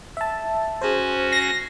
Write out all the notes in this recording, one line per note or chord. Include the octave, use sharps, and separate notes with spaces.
E5 A5
C#4 F#4 G#4 C5
A#6 C7